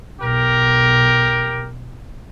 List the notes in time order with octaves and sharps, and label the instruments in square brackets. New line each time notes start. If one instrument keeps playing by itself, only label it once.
[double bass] B1 [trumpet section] G4 A#4